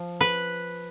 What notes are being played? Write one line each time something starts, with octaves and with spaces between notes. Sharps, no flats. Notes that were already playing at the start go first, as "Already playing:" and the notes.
Already playing: F3
B4